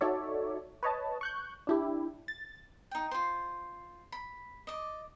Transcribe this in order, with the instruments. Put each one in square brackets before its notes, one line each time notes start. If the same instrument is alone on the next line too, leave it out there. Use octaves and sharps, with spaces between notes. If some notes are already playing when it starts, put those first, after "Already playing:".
[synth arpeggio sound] D#4 F#4 A4 C#5 D5 E5
B4 C#5 D#5 A5
C#6 F#6 G6
D4 E4 G4
A6
[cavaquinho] D#4 G5
F4 C5
B5
D5 D#5